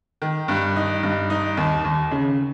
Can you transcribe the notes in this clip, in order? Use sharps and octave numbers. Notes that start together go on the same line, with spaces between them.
D#3
G2
D#4
G2
D#4
D#2
D#2
C#3